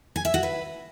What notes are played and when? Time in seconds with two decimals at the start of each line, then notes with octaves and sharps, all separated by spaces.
0.16 G#5
0.25 E5
0.34 F#4
0.43 B4